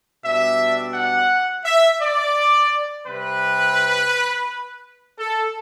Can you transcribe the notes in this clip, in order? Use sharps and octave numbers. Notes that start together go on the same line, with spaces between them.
B2 G3 D4 E5
F#5
E5
D5
C3 G3 C4 B4
A4